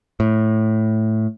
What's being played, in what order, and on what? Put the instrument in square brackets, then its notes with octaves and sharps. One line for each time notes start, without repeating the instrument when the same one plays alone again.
[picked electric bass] A2